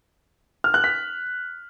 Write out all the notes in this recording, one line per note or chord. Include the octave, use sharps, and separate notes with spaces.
F6
F#6
B6